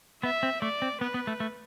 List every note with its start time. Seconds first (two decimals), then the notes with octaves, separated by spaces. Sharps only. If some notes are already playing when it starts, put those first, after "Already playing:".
0.23 B3 E5
0.43 C4
0.62 A3 D5
0.82 C4
1.01 B3 B4
1.14 B3
1.27 A3
1.40 A3